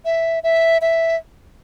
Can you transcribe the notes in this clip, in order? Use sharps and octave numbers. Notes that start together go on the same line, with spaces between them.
E5
E5
E5